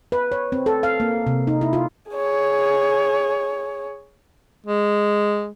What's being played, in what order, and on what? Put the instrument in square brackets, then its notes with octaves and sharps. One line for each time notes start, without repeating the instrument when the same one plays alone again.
[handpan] B4
C#5
C4
A4
F5
A#3
C3
D#4
E4
F4
[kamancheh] G#4 C#5
[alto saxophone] G#3